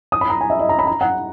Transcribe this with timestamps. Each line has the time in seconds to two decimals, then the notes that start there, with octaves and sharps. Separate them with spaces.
0.12 D#6
0.21 B5
0.30 A#5
0.41 G#5
0.50 E5
0.59 D#5
0.69 A#5
0.79 B5
0.87 A#5
1.01 F#5